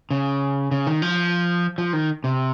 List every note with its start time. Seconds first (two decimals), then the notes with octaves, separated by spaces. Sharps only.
0.11 C#3
0.71 C#3
0.87 D#3
1.02 F3
1.78 F3
1.93 D#3
2.24 C3